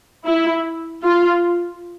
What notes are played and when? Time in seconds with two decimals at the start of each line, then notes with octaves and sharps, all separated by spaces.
0.26 E4
1.03 F4